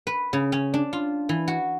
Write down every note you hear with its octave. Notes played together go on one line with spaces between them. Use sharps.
B4
C#3
C#4
D4
F4
E3
F#4